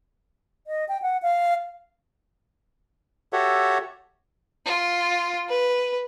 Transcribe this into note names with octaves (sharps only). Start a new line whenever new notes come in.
D#5
G5
F#5
F5
F#4 G4 A4 C#5 E5 F#5
F4
B4